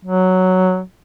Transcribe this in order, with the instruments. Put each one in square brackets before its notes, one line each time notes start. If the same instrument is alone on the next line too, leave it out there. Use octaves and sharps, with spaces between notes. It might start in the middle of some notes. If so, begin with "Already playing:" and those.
[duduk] F#3